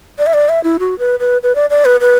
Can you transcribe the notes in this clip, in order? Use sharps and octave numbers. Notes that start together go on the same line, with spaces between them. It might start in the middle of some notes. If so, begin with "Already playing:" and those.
D5
E5
D5
E5
E4
F#4
B4
B4
B4
D5
D5
B4
B4